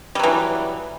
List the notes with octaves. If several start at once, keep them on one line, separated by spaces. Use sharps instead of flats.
E3 F#3 G3